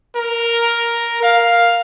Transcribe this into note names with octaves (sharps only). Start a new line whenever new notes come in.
A#4
F5